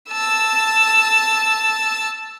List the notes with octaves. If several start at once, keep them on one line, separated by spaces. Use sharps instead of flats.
A5 E6